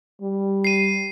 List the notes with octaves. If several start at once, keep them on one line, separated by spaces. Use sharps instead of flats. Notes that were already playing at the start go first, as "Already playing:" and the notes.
G3
C7 D#7